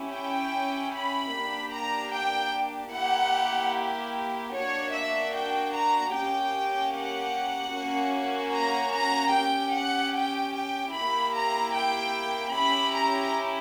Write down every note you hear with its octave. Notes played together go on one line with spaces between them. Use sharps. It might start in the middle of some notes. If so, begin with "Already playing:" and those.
Already playing: C#4 E4 G4
G5
B5
A#3 D4 G4
A#5
G5
A#3 E4 G4 F#5
A#3 D4 F#4 C#5
E5
G5
A#5
A#3 C#4 G4 G5
F#5
A#3 C#4 F#4
A#5
A#5
C#4 G4 G5
F#5
G5
G5
A#3 E4 G4 B5
A#5
G5
C#4 E4 G4 B5
A#5